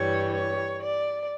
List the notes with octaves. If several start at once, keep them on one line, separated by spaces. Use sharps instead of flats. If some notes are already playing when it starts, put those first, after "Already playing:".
Already playing: G2 E3 G3 C#5
C#5
D5